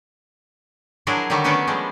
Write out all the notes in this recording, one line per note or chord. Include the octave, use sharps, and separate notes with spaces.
F3 F#3 D4 E4 G#4 A#4
D3 D#3 F#3 G3 E5 A#5
A3 B3 C#4 D4 A#4 D5
F3 G3 G#3